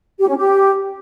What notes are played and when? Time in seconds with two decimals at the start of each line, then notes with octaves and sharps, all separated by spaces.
0.20 G4
0.28 C#4
0.37 G4